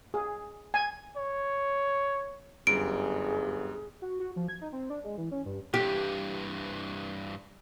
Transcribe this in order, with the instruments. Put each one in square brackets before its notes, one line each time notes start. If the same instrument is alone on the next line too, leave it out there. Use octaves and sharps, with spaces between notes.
[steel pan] G#4
G#5
[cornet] C#5
[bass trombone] G1 [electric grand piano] F#2 G3 [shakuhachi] G#4 [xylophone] D7
[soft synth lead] F#4
F#4
F3
G#6
D#4
C4
D4
G#3
E3
C#4
G2
[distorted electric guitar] G2 E3 [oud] G4